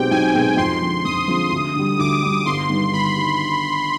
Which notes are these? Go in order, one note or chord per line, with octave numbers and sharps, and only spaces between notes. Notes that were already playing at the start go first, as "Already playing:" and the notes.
Already playing: B1 B2 G#3 C4 G4 G5
B1 G#5
B2 G#3 C4 G4
F2 C6
D3 F3 G#3 C4
F2 D#6
D3 F3 G#3 C4
D2
D3 G3
D2 D6
D3 G3
G1 C6
G2 D#3 G3
G1 B5
D#3 G3